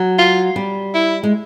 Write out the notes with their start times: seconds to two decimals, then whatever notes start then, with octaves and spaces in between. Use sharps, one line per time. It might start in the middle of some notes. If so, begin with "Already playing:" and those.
Already playing: F#3
0.18 F4
0.56 G3
0.94 E4
1.23 G#3